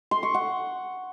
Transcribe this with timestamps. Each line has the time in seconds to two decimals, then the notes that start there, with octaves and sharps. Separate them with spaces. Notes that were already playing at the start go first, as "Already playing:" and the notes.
0.11 C6
0.23 C#6
0.34 F#5